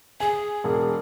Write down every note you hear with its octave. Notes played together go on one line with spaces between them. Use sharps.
G#4 G#5
E1